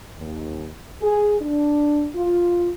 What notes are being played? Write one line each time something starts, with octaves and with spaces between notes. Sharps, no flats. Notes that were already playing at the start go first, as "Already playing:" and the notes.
D#2
G#4
D4
F4